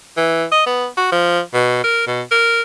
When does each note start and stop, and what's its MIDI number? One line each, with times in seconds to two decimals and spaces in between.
0.17 0.44 52
0.51 0.63 75
0.66 0.87 59
0.97 1.07 66
1.12 1.40 53
1.53 1.80 47
1.84 2.04 70
2.07 2.22 47
2.31 2.62 70